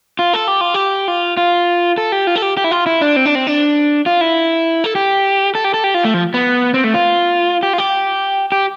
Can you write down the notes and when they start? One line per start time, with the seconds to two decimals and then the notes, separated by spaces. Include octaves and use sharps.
0.19 F4
0.34 A4
0.48 G4
0.61 F4
0.74 G4
1.08 F4
1.37 F4
1.98 A4
2.12 G4
2.27 F4
2.36 A4
2.42 G4
2.57 G4
2.64 E4
2.71 F4
2.86 E4
3.01 D4
3.16 C4
3.25 D4
3.35 C4
3.47 D4
4.06 F4
4.21 E4
4.84 A4
4.95 G4
5.55 A4
5.64 G4
5.74 A4
5.84 G4
5.94 F4
6.05 A3
6.14 F3
6.34 B3
6.74 C4
6.84 A3
6.94 F4
7.63 G4
7.73 F4
7.78 G4
8.52 G4